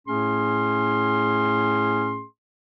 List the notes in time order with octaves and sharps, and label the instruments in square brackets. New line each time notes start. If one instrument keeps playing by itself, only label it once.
[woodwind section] A2 A3 C#4 G#4 C6